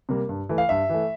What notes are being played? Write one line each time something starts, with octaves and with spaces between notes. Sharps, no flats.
C3 G3 A#3
G2
E3 A3
F5
G2 E5
E3 A3